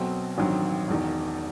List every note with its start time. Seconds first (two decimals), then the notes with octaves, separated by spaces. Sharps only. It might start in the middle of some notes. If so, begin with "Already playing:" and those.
Already playing: B1 B2 F#3 C4
0.38 A1 G2 D#3 F#3 C4
0.88 E1 E2 D#3